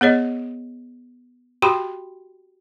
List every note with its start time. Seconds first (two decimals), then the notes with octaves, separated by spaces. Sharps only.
0.01 B3 G#4 C#5 D#5
1.62 F#4 G4 G5 B5 C6